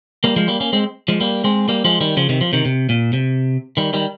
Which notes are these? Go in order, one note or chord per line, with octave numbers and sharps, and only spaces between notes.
G3 A#3
F3 G#3
G3 A#3
A#3 C#4
G#3 C4
F3 G#3
G3 A#3
G#3 C4
G3 A#3
F3 G#3
D#3 G3
C#3 F3
C3 D#3
F3
C3 D#3
C3
A#2
C3
D#3 G3
D#3 G3